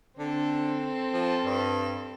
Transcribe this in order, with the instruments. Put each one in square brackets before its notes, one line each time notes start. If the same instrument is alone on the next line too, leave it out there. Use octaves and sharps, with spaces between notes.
[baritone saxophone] D3 [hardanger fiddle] C4 A4
[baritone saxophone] F3
G2